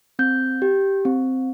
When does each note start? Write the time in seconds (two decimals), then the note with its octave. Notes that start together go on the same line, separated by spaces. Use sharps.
0.19 C4 G6
0.62 G4
1.05 C4